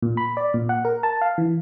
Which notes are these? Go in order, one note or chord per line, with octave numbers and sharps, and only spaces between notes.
A#2
B5
D5
A#2
F#5
A#4
A5
F5
E3